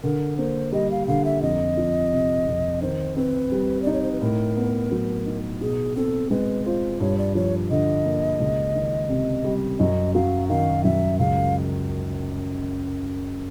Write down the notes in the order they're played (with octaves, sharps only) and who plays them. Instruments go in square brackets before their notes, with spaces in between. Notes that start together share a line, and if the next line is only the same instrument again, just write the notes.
[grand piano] D3 [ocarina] A#4
[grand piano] A#3 [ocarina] C5
[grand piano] G3 [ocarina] D#5
[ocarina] F5
[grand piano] D3 [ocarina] F5
[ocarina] E5
[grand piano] F2 [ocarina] D#5
[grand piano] F3
C3
F2
[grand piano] D#3 [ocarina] C5
[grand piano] C4 [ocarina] B4
[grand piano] G3
[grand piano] D#4 [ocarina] D5
[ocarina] C#5
C5
B4
[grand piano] A2 [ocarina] A#4
[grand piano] B3
F#3
D#4
[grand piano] B2 [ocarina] G#4
[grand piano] C4 [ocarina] A4
[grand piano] G#3 [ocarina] B4
[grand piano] F4 [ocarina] C5
[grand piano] G2 [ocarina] C#5
[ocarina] D5
[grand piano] F3 [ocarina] C#5
[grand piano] D3 [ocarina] D#5
[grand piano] A#3
C#2
D#3
C3
G3
[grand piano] F#2 [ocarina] D#5
[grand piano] F#3 [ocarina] F5
[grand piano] D#3 [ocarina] F5
[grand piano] F#2 [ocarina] E5
[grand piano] C#2 [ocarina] F5